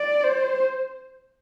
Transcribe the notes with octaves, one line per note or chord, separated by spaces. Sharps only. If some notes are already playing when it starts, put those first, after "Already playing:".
Already playing: D5
C5